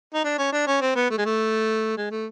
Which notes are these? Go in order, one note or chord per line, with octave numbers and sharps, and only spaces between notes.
D#4
D4
C#4
D4
C#4
C4
B3
A3
G#3
A3
G#3
A3